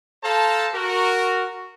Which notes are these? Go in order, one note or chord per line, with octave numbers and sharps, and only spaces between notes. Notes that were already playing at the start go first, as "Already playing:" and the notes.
A4 C5 F5 A5 A#5
F#4 A#4